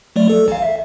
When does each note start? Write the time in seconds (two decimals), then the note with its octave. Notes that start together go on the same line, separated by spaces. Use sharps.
0.16 F#3 A3 D5
0.29 A4
0.48 A1 F5
0.62 E5